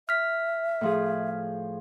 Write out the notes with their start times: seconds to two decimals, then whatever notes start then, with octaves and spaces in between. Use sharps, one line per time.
0.09 E5 F6 B6
0.81 A2 F3 G#4